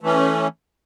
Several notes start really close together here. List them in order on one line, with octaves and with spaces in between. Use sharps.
A3 E3 C#4